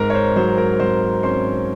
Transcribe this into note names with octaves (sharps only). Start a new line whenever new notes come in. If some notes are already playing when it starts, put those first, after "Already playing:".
Already playing: G#2 A#4 A#5
C#5
C5
F#3 C5
A#4 A#5
G#2 C5 C6
C#4 C5 C6